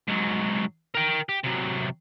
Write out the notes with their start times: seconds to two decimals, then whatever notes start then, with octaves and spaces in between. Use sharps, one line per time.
0.08 G#2 F#3
0.95 A#4 G5
1.29 G4
1.44 C3 F#3